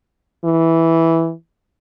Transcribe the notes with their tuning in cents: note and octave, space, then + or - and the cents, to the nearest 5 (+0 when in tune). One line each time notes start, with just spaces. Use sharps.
E3 -5